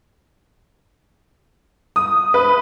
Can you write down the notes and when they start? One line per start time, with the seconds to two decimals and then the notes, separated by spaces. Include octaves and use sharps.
1.96 D#6
2.34 B4